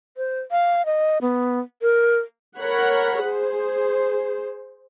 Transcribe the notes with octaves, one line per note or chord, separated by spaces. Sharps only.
C5
F5
D#5
B3
A#4
A#4 C#5 F#5 B5
G#4 C5